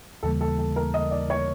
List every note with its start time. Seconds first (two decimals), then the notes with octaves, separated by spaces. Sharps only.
0.23 D#2 C#3 E3 G3 A#3 A4
0.41 A4
0.58 A4
0.76 A#4
0.94 D#5
1.11 D5
1.30 C#5